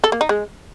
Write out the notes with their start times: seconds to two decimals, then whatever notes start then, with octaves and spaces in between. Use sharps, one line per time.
0.04 A4
0.12 A#3
0.21 D#4
0.29 G#3